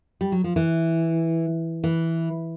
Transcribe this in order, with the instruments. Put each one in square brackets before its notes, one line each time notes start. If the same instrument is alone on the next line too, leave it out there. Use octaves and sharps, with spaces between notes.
[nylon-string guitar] G3
F#3
F3
E3
E3